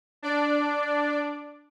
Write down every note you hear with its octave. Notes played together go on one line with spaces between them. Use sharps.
D4 D5